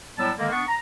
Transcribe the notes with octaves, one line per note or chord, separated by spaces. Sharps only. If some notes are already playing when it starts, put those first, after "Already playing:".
A2 F#3 G3 B3 A5 E6
D3 D#3 G#3 A#3
B3 D4 C#6
A#5